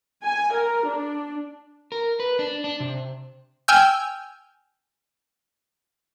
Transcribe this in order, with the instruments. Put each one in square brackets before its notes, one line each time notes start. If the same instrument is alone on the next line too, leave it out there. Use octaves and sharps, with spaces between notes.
[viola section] G#5
A#4
D4
[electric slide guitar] A#4
B4
D4
D4
C3
[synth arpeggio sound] G5 G#5 E6 F6 G6